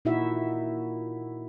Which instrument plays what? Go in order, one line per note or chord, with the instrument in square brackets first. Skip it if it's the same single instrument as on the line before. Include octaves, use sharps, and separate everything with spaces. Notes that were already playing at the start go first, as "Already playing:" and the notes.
[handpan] A#2 D#4 E4 F#4 E5